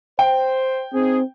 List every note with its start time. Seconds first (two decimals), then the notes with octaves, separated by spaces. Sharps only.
0.19 C5 G5
0.94 C4 D#4 G#4